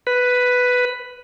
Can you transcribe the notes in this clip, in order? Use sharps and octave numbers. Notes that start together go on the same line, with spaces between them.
B4